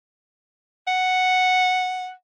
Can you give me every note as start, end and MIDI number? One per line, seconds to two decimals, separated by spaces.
0.88 2.12 78